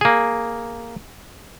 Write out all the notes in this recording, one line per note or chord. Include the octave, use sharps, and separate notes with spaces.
A#3 G#4